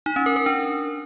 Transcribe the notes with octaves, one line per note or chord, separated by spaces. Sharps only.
D#4
C#4
A#4
A#4
D4